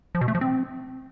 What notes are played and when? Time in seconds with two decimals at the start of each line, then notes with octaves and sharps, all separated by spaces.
0.15 F3
0.21 B2
0.28 A3
0.35 F3
0.41 C4